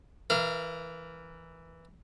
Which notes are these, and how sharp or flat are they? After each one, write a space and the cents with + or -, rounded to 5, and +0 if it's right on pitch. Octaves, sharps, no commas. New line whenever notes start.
E3 +0 A#4 +0 F5 -40